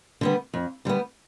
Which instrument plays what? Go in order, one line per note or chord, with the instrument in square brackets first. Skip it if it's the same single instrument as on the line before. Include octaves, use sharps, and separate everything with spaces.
[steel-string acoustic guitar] D3 G3 B3
F2
D3 G3 B3